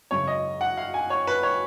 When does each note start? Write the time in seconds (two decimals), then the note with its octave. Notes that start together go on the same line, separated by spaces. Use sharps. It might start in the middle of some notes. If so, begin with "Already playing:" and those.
0.11 G#1 F#2 C#3 C#5
0.28 D#5
0.61 F#5
0.77 F5
0.94 G#5
1.10 C#5
1.27 B4
1.43 C#5